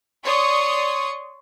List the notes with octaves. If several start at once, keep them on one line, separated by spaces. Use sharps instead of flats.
C#5 D5 C6 C#6 D#6